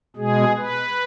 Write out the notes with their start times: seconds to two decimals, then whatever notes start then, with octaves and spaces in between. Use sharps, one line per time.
0.16 B2 G#3 G#4
0.56 B4